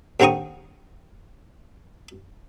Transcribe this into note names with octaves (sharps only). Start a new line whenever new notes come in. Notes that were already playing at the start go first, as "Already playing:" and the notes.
D#2 D3 C4 A#5 C#6 D#6